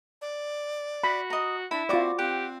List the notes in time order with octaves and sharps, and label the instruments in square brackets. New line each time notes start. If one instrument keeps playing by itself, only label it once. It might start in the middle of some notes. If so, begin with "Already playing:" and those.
[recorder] D5
[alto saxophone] F#4 [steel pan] B5
[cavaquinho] D#5 A#5
[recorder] D4 [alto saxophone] E4 [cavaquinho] B5
[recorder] C4 [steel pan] F4 D5 [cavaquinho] F#4 D6
[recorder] C4 [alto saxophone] G4 [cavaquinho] F#5